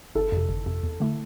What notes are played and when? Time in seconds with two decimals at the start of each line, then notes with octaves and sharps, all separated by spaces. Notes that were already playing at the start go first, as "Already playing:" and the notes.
0.15 G1 A4
0.32 F2 C3
0.49 G1
0.66 F2 C3
0.83 E2
1.00 D3 A3 E4